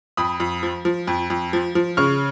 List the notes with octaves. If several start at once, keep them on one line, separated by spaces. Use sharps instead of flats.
F2 B5 D#6
F2
F3
F3
F2
F2
F3
F3
C#3 C#6 F6